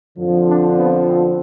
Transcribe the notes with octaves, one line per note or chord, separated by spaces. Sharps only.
F2 D3 F3
D4
B3
C4